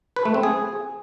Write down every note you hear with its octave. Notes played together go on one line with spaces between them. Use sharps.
B4
A3
C4
G#4